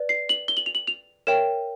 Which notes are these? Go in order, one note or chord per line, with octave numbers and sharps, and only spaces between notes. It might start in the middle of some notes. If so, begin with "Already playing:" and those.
Already playing: B4 D5
C7
F#7
G7
F#7
F7
F#7
F7
A#4 C#5 E5 G5 E7